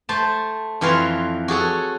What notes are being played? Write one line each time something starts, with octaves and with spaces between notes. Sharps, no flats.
A3 C5 A5
F2 E3 F4 C#5 F5 C6
F#4 G#4 A4 C#5